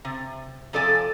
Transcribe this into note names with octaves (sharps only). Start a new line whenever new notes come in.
C3
C3 F3 A4 D5 G#5